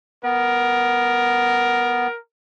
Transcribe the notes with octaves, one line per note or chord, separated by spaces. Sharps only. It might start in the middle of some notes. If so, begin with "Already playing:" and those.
B3 A#4